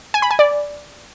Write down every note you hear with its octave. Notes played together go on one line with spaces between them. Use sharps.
G#5
B5
G#5
D5